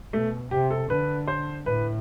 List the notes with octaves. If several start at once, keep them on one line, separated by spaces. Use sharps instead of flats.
B2 A3
C3 G4
A4
D3 B4
C5
A2 B4